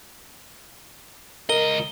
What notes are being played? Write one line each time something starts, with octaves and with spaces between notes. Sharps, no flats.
C#2 A#4 D#5 G7